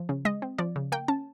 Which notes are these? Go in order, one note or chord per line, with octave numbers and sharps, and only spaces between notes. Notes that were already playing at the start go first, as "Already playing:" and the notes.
Already playing: F3
C#3
G#3 D#5
C4
F3 D5
C#3
A#3 G5
C#4 A5